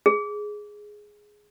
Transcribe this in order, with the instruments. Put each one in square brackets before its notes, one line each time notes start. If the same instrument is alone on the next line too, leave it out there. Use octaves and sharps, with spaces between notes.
[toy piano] G#4